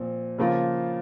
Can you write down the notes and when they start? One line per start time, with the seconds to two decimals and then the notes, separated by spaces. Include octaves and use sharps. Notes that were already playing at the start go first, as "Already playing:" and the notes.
Already playing: A#2 F3 C4
0.38 C#3 F3 A#3 F4